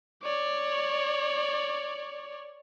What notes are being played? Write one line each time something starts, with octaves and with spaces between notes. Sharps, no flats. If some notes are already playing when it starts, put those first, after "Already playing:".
C#5 D5